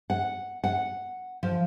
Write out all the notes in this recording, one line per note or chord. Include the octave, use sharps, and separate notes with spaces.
F#5
F#5
F3